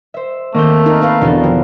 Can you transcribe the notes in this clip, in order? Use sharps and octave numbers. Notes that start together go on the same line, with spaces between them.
C5 E5
D#3 A3 A#3 C4 G6
D#4 A#4
D#4 B4 F5
E2 B2 D3 F4 A4
F3 G5